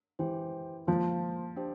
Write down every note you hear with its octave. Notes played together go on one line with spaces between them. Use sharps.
E3 G4 C5 G5
F3 A#3 F4 C5 F5 A5
D4 G4 C5 G5